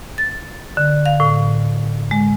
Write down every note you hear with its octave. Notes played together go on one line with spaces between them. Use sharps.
A6
D3
F5
A2
G#3